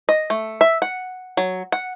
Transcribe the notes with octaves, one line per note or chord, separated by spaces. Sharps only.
D#5
A3
E5
F#5
F#3
F#5